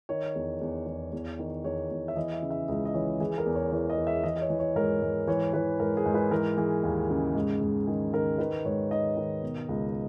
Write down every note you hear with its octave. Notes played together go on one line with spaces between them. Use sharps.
D#3 C#5
E2
E2
E2
E2
D#3
E2 C#5
E2
E5
E3 D#5
E5
C#3
E5
C#2 D#5
D#5
E3 C#5
E3 G#4
A#4
E2
C#5
E3 C#5
D#5
E2
E5
E3 D#5
D#5
C#5
E3
C#5
G#2 A#4
G#2
E3 C#5
E3 B4
G#2 A#4
G#4
G#2
B4
E3 A#4
E3 G#4
D#2
C#3
G#2
G#2
D#3 G#4
D#3 A#4
D#3 B4
G#2 C#5
D#3 D#5
D#3
B2
C#2